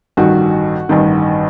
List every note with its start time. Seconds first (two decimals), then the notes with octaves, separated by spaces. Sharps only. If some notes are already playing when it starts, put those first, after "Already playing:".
0.17 A1 G2 D#3 F#4
0.89 A1 G2 D#3